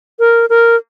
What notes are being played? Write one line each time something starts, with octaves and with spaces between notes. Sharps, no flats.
A#4
A#4